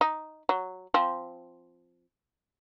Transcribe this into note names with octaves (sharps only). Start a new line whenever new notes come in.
D#4
F#3
F3 C4